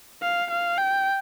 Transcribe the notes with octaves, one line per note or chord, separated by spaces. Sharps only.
F5
F5
G5